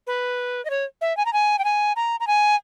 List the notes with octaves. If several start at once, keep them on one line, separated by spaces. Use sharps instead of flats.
B4
D#5
C#5
E5
G#5
A#5
G#5
G5
G#5
A#5
A#5
G#5